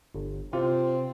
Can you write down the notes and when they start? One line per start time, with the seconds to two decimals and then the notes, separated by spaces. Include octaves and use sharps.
0.15 G1
0.53 C3 C4 F4